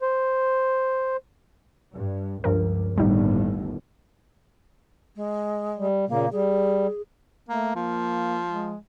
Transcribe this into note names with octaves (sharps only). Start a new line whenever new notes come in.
C5
G2
C#2 G2 F3 A#4
G1 D#2 A2 G3 D#4
G#3
G3
A#2 C#3 A#3
G3 G#4
A3 A#3
F3 A#3
G#3